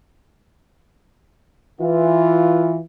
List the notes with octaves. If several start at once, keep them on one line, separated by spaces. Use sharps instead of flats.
E3 F4